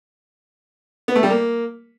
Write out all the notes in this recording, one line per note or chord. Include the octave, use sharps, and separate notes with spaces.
B3
A3
G3
A#3